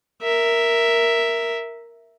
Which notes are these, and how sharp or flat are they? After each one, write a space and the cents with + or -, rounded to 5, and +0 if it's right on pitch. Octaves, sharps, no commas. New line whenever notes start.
A#4 +0 E5 +0